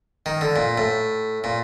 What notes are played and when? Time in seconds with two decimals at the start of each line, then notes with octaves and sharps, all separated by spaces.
0.26 D#3
0.41 D3
0.56 A#2
0.78 A2
1.44 A#2